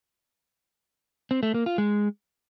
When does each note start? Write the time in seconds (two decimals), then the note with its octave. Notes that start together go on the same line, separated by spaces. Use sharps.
1.31 C4
1.43 A3
1.54 A#3
1.66 F4
1.78 G#3